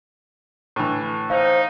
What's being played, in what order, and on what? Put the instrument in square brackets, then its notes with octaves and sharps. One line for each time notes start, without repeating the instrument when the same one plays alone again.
[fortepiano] A2 D3 E3
[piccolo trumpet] D#4 [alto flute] C5 [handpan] F5